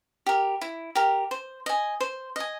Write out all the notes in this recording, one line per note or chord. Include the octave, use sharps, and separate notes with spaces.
G4 A#4
E4
G4 A#4
C5
D#5 G#5
C5
D#5 G#5